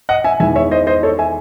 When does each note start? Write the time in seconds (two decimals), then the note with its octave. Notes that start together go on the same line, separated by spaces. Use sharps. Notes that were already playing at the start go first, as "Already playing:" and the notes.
0.09 D#5 F#5
0.24 E5 G#5
0.40 E2 D#3 G#3 E5 G#5
0.56 C#5 E5
0.71 C5 D#5
0.87 C5 D#5
1.03 A4 C#5
1.19 E5 G#5